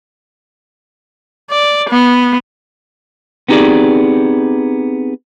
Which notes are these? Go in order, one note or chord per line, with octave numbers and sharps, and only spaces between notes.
D5
B3
B3 C4 D#4 G4 G#4 D5